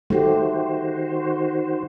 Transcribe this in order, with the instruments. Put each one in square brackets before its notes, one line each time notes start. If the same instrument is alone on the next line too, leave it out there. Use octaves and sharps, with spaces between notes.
[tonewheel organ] D#3 F#4 C5 [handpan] A3 G4